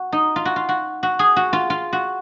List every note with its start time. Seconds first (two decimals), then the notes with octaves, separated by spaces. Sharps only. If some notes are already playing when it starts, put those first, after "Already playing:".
Already playing: F#4
0.12 D#4
0.36 F4
0.45 F#4
0.56 F4
0.69 F#4
1.03 F#4
1.19 G#4
1.36 F#4
1.53 F4
1.70 F4
1.93 F#4